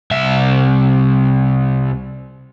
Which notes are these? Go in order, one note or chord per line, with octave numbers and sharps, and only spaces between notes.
C2 E5